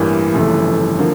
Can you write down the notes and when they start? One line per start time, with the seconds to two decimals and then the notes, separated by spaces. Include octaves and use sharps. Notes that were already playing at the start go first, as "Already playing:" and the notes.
Already playing: A1 G2 E3 A#3
0.34 G1 F2 C#3 E3 A3
0.99 D3 F3 A#3